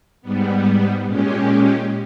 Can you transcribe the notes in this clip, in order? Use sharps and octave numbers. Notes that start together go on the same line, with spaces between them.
G#2 G3 B3
A#2 G#3 C#4 G4